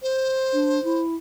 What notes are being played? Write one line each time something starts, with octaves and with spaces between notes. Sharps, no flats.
C5
D4
E4